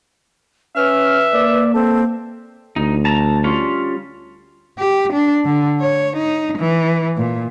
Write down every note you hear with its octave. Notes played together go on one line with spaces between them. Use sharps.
C#4 B4 E5 F6
A#3 D5
C4 A4
D2 D#4
A5 A#5
G3 C#4 F4
G4
D4
D3
C#5
D#4
E3
A#2